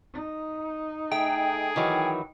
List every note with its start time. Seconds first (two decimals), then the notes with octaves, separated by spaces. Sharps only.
0.13 D#4
1.12 A3 G#4 G5
1.76 D#3 E3 F#3